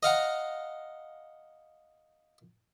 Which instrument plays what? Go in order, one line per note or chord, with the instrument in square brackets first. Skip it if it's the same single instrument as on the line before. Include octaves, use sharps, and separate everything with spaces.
[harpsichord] D#5 F5 F#5 A#5